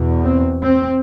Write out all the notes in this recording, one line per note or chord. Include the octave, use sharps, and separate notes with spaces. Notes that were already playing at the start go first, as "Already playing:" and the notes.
Already playing: E2 B2
C4
C4